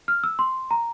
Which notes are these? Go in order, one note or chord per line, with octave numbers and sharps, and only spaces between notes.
F6
E6
C6
A#5